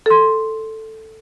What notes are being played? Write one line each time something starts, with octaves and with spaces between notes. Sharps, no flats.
A4 C6